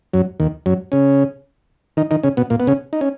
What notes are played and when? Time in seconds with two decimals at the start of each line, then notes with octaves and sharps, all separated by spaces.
0.13 F#2 F#3
0.40 D#2 D#3
0.66 F#2 F#3
0.92 C#3 C#4
1.97 D#3 D#4
2.11 D#3 D#4
2.23 C#3 C#4
2.37 B2 B3
2.50 A#2 A#3
2.60 B3
2.67 C#3 C#4
2.93 D#4
3.01 C#4